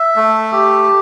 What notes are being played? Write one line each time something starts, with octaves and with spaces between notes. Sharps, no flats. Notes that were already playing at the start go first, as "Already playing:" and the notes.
Already playing: E5
A3
G4